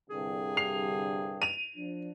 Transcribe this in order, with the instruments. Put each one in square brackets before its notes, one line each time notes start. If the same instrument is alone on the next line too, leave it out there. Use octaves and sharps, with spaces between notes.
[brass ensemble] C2 G2 D3 [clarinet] G#4
[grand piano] C7 F7
D#7 F7
[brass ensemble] F3 D4